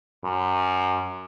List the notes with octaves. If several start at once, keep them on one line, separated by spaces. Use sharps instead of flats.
F#2